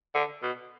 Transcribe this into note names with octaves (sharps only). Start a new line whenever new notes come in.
D3
B2